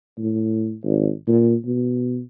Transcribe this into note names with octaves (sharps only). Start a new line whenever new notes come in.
A2
G#1
A#2
B2